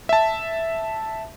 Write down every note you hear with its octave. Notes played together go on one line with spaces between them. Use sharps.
E5 A5